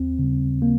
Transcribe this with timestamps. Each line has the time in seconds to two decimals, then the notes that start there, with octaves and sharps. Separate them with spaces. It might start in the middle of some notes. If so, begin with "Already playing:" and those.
Already playing: D#2 C4
0.19 C#3 G3
0.62 A#3